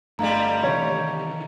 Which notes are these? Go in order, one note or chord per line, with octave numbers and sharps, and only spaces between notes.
G1 D3 G3 A3 D#5 F5 A#5
C3 D#3 E3 C#5